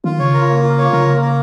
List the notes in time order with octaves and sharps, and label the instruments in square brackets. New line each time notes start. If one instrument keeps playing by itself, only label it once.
[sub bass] D#3 [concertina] F4
[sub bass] C#3 [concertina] C#5
[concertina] A#4
A#3
F4
C#5
[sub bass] C#3 [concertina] A#4
[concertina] A#3
A#4